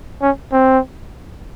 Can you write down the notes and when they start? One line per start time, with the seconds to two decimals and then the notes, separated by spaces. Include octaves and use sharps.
0.22 C#4
0.52 C4